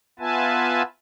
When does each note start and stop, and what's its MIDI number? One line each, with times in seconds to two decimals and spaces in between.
0.19 0.82 59
0.19 0.82 65
0.19 0.82 71
0.19 0.82 76
0.19 0.82 80
0.19 0.82 81